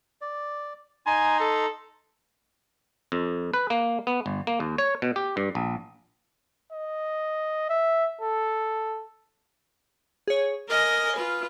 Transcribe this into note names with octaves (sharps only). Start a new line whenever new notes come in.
D5
D#4 G#5 A#5 C6
A4
F2
B4
A#3
B3
G1
A#3
D#2
C#5
B2
G4
G2
A#1
D#5
E5
A4
G#4 C#5
A#4 D#5 G#5 D#6 F6
F4 B4